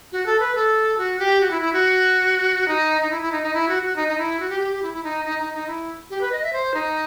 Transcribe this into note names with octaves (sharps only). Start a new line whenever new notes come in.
F#4
A4
B4
A4
F#4
G4
F#4
E4
E4
F#4
D#4
D#4
E4
E4
D#4
D#4
E4
F#4
F#4
D#4
D#4
E4
F#4
G4
G4
G4
E4
E4
D#4
D#4
D#4
D#4
E4
G4
B4
D#5
E5
C5
D#4